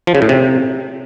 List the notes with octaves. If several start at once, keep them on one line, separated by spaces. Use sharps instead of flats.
F3
C#3
A2
C3